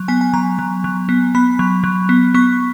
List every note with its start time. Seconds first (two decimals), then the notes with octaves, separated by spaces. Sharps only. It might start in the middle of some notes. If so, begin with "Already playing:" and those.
Already playing: F#3
0.08 B3 G#5
0.21 G#5
0.34 F#3 A#5
0.59 F#3
0.84 F#3
1.09 B3
1.35 B3 B5
1.59 F#3
1.84 F#3
2.09 B3
2.34 B3 C#6